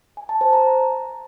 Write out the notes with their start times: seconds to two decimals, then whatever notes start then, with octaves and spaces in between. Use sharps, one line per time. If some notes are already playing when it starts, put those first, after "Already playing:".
0.17 G#5
0.29 A5
0.41 C5
0.53 A#5